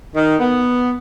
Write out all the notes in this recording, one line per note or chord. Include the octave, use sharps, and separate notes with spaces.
D#3
B3